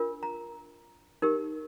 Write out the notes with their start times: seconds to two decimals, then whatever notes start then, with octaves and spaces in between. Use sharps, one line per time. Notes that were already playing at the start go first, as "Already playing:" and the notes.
Already playing: D4 F4 A#4
0.23 A#5
1.22 D#4 G4 A#4